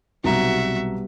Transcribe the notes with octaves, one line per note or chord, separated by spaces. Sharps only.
B1 C3 G3 B3 F#4 E5 A#5